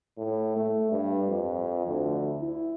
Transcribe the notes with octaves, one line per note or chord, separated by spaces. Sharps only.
A2
A3
G2
F2
D2
E4